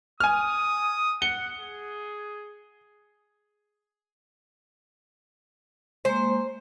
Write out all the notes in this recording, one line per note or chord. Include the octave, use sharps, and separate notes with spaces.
G#5 D#6 F6
F#5 C#7 G7
G#4
G#3 A#3 C5